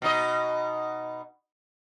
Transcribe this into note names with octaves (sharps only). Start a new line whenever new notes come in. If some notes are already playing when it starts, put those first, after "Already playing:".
B2 D#4 D#5